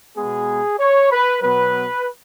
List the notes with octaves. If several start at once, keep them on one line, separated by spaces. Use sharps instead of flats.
B2 G#3 B3 G#4
C#5
B4
B2 F#3 B3 B4